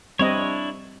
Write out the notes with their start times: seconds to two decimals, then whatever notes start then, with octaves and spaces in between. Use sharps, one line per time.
0.19 G3 C4 D4 E4 C#5 D#5